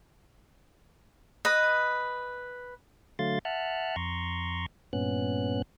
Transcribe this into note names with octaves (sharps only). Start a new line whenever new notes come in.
B4 D#5
D3 F#3 A3 F5 C6 A6
E5 F#5 A5 F6 F#6
F2 A#5 C6 C#6
G2 A#2 B3 C#4 F#6